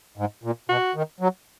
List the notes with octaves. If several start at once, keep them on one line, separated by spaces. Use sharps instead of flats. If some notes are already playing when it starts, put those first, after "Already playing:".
G#2
A#2
B2 F#4
D#3
F#3